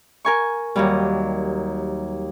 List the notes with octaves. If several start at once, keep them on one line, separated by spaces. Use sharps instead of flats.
A#4 G#5 C#6
D#2 F#3 G3